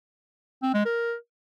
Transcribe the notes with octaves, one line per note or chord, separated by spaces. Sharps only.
C4
G#3
A#4